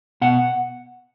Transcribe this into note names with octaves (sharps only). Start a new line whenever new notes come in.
B2 F#5